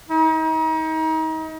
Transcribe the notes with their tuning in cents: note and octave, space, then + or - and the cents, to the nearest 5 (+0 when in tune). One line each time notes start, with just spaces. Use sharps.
D#4 +35